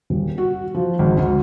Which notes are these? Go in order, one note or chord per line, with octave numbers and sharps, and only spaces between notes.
D#1
F#4
F3
G#1
D2